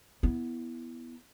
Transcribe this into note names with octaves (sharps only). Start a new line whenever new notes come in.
B3 E4